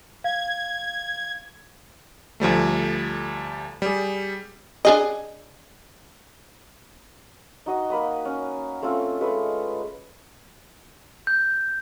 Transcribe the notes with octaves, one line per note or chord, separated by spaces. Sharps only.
F5 G#6
D2 F3 G3 A3
G3 G#4
D4 G#4 D#5
D#4 F#4 D#5
A#3 B5 D#6
C#4
A3 C4 C#4 F4
G#3 A3 B4
G6